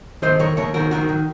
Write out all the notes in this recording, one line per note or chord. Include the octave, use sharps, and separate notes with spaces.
D#3 C5 D#5
D#3 A#4 C#5
D#2 A#4 C#5
D#3 F#4 A#4
D#3 F#4 A#4
D#3